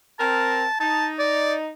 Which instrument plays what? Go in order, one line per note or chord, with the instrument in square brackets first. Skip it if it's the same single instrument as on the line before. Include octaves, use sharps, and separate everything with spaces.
[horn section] C4 A#4 [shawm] A5
[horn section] D#4 [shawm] A5
[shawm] D5